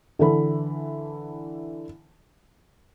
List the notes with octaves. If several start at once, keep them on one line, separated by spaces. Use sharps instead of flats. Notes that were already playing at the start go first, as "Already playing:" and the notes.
D3 E3 A4 B5